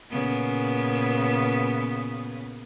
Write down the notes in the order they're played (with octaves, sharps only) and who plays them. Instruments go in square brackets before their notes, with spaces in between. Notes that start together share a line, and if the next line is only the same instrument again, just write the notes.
[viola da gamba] A#2 C#3 B3